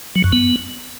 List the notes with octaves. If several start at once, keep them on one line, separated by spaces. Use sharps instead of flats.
F#3
F#2
B3